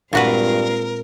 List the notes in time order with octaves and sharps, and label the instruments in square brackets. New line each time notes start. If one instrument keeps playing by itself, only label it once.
[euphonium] G2 [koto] A#2 F#4 B4 [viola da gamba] G#3 C4 F4 [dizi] A#4